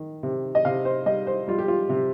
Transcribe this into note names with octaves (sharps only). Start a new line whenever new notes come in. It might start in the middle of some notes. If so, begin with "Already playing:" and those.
Already playing: D#3
C3
D#5
C3 F5
C5
G3 D#5
C5
G3 F4
G4
F4
C3